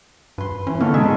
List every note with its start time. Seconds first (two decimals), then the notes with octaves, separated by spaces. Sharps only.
0.38 G2 B4 C6
0.67 E3 C#4
0.80 D3 D#3 F3 A#3 C#4 A4 F5
0.94 D#2 G#2 C3 G#3 G#4 A4 E5